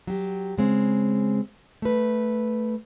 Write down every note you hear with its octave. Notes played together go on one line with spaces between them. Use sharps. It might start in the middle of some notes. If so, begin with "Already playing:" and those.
F#3 G4
C#3 G#3 C4
A3 B4